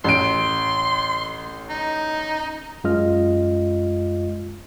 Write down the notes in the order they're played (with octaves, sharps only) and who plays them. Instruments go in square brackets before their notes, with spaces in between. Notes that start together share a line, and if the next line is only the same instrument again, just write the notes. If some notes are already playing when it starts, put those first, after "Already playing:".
[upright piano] A1 D7 [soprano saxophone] C6
[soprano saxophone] D#4
[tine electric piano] F#2 G#3 F4 D#5 F6